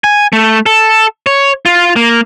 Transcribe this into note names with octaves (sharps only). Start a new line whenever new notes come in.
G#5
A3
A4
C#5
F4
A#3